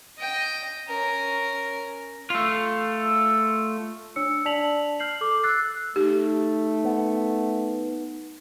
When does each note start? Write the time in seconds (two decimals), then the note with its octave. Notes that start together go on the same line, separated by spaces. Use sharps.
0.19 D#5 G5
0.88 C#4 A#4
2.30 A3 F4
4.16 D4 C#5 E6 C#7
4.45 D4 D5 A5 B6 F7 F#7
5.00 F6 G6 C7 F#7
5.21 A4 D6
5.43 E6 F#6 A6 C7
5.96 A3 D#4 G4
6.84 B3